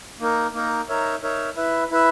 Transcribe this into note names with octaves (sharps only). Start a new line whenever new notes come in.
A#3 D#4 A#4
A#3 D#4 A#4
D#4 A#4 C#5 E5
D#4 A#4 C#5 E5
E4 B4 E5
E4 B4 E5